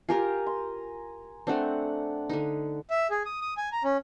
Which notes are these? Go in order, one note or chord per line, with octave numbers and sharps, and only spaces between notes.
F4 G4 A#4 G#5 A#5
C6
A3 C4 D4 F#5
D3 D#4
E5
G#4
D#6
D#6
G#5
A#5
C#4